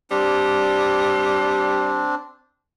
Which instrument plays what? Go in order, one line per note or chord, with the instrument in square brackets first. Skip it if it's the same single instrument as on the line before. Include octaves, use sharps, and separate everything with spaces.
[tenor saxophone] G3 [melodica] C4 D4